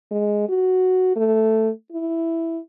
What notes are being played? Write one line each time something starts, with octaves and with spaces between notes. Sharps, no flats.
G#3
F#4
A3
E4